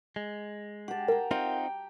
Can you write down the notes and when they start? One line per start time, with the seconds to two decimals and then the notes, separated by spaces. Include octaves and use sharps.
0.16 G#3
0.88 G4 F#5 A5
1.08 A#4 G5 A#5
1.31 C4 D#4 F4 G5